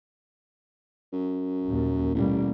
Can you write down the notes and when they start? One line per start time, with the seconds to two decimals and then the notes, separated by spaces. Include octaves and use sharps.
1.12 F#2
1.65 A#1 D#2
2.14 A1 B2 G3 A#3